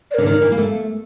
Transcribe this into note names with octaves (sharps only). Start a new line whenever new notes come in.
D5
D3 A#4
D#3
E3
A#3
A3